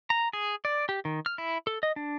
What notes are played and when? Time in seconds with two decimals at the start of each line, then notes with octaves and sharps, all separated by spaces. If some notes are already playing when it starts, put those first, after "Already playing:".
0.10 A#5
0.33 G#4
0.65 D5
0.89 G4
1.05 D#3
1.26 F6
1.38 E4
1.67 A4
1.83 D#5
1.96 D4